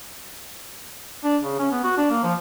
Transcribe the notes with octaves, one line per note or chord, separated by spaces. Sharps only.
D4
C#3
C#4
B3
F#4
D4
A#3
F3